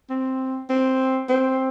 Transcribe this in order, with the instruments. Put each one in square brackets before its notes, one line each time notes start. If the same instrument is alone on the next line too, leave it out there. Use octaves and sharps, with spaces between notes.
[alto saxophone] C4
C4
C4